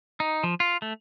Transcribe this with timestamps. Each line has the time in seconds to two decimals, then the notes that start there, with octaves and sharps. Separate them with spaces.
0.20 D#4
0.43 F3
0.60 F4
0.82 A3